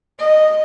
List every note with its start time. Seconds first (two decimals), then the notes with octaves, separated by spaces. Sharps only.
0.19 D#5